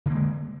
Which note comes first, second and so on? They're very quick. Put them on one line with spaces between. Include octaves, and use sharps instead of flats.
D3 A#3 G#3